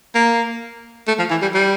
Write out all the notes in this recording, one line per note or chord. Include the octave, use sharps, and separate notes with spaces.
A#3
A3
F3
E3
G3
G3